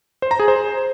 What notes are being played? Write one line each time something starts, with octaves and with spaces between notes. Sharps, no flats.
C5
A#5
G#4
C5